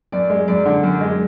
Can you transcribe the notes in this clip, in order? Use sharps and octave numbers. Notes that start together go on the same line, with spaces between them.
F#2 D5
G#3
F#2 D5
D3
F#2
G#3